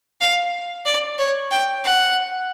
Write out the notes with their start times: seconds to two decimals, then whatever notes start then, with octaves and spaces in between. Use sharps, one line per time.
0.21 F5
0.86 D5
1.19 C#5
1.51 G5
1.84 F#5